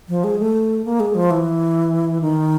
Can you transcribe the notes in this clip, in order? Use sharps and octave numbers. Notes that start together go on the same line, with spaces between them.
F3
G#3
A3
A#3
G#3
F3
E3
D#3